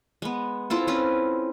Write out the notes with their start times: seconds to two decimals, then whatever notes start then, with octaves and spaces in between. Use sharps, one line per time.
0.22 G#3 B3
0.70 C4 E4 F4 A4
0.87 C4 C#4 B4